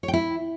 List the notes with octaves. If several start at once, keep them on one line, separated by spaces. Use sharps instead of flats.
C#5
G5
E4